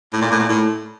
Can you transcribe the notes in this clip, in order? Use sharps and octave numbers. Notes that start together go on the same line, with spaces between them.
A2
A#2
A2
A#2
A2